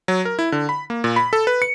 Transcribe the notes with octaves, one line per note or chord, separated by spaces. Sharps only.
F#3
A#4
E4
D3
B5
A#3
A#2
B5
A4
B4
C#7